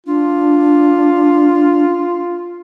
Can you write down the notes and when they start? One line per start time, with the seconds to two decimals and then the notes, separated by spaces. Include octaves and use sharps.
0.07 D4 F4